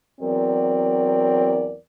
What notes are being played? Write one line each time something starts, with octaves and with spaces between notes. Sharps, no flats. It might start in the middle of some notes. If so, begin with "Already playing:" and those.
E2 F#3 C4 A#4 D5